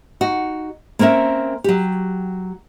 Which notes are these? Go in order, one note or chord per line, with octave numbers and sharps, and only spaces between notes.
D#4 F#4
A#3 C4 C#4 A#4 E5
F#3 G4